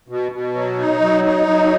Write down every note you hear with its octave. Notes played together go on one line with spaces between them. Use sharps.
B2
B2
F#3
D#4
F#3
D#4
F#3